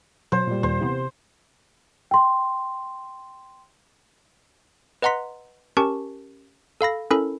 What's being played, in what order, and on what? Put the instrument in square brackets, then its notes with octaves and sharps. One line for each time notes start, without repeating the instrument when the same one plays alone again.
[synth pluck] F#2 B2 F#3 [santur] C5
[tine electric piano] A#2 G3
[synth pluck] D#2 [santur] C5
[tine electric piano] C3 [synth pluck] E3 B3
[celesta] G5 C6
[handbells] B4 D#5 F#5 A#5 C6 B6
C#4 G4 A#4 A5 C#6
A4 F5 B5 A#6
C#4 E4 A4 A#4 B5